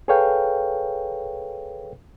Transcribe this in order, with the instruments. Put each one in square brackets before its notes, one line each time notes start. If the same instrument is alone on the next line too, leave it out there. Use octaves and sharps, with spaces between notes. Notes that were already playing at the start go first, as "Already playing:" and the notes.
[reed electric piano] G#4 A4 B4 C#5 F5 G5